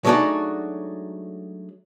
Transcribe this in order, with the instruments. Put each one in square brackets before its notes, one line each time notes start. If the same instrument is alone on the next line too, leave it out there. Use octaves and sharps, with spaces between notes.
[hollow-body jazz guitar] F#3 G#3 A3 D4 D#4 F#4